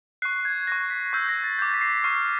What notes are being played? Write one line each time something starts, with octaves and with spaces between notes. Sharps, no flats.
C#6 F#6 C7
G#6
C#6 F#6 A#6
B6
C#6 E6 G6
A#6
A6
D6 G6 A6
B6
C7
C#6 F6 C7